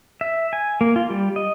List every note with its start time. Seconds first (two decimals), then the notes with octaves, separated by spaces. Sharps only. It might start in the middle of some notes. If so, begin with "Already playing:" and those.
0.21 E5
0.53 G#5
0.81 A#3
0.96 F4
1.10 G3
1.36 D#5